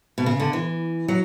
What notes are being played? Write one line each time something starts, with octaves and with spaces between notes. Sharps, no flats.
B2
C#3
D3
E3
F#3